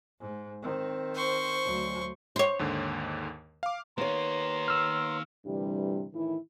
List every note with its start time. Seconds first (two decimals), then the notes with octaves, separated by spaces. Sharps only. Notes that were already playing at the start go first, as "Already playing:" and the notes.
0.20 G#2
0.62 D#3 C4
1.14 C5 C#6
1.64 D2 F#3
2.36 C5 C#5
2.59 D#2 G#2 D3
3.63 F5 D6
3.98 D#3 A#3 B3 C#5 A#5 C6
4.68 E6 F6
5.45 D2 G2 C3 E3 G3
6.13 A2 D#3 E3 E4